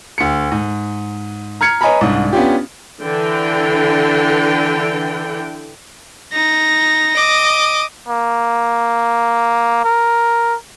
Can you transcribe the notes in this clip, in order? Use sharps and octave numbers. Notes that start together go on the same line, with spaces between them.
D2 C#7
G#2
A#5 F6 G#6 C#7
B4 C#5 D#5 G#5 A#5 B5
C2 G#2 D4
B3 C#4 D4 F4 G4
D3 E3 G5
D#4 A#6
D#5 D6
A#3
A#4